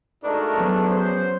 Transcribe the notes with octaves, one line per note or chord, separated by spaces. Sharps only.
G#2 A3 D4 D#4 F#4 A#4
E2 F#3 B3 C#4
C5